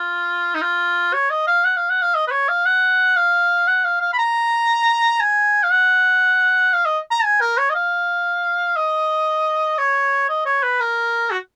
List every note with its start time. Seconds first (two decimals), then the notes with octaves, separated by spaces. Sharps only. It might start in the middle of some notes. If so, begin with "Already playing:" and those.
Already playing: F4
0.55 D#4
0.62 F4
1.13 C#5
1.30 D#5
1.47 F5
1.64 F#5
1.77 F5
1.90 F#5
2.02 F5
2.15 D#5
2.27 B4
2.31 C#5
2.49 F5
2.65 F#5
3.16 F5
3.67 F#5
3.85 F5
4.01 F5
4.13 B5
4.18 A#5
5.21 G#5
5.63 F5
5.71 F#5
6.73 F5
6.85 D#5
7.11 A#5
7.24 G#5
7.41 A#4
7.58 C#5
7.70 D#5
7.75 F5
8.76 D#5
9.78 C#5
10.29 D#5
10.46 C#5
10.63 B4
10.80 A#4
11.31 F#4